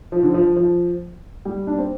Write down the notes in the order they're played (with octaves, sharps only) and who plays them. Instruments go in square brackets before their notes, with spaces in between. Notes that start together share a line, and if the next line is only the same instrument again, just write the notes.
[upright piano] F3
D3
F3
F3
G3
D4
C4